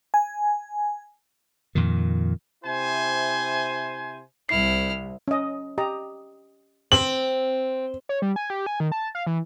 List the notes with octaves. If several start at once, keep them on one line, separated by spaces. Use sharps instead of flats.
G#5
F2 A#2 D#3
C3 E4 C5 G#5
C2 E4 F6 C7
C#4 D#5
G4 D#5 A#5
C4 F#7
C#5
G3
G#5
G4
G#5
D#3
A5
F5
E3